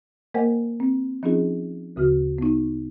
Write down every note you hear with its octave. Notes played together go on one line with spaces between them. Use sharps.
A#3 A#4 C5 D#5 F#5 G5
C4
F3 C4 C#4 D#4 F4 G#4
D2 C#3 F#4 F6
B3 D#4